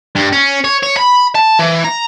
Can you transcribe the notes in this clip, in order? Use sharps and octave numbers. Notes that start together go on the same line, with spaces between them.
G2
C#4
C#5
C#5
B5
A5
E3
A#5